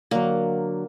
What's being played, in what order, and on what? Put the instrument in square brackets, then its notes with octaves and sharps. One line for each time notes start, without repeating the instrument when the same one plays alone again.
[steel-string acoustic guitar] D3 F#3 [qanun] A#3